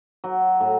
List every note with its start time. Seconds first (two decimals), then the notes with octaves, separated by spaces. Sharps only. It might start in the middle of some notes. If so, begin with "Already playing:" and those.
0.24 F#3
0.61 A2